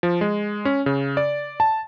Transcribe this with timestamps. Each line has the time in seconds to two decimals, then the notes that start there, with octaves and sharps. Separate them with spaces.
0.03 F3
0.21 G#3
0.65 C#4
0.86 C#3
1.17 D5
1.60 A5